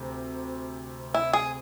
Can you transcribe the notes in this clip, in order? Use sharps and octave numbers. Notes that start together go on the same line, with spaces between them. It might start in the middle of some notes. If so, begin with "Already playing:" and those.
Already playing: D2 C3
E4
G#4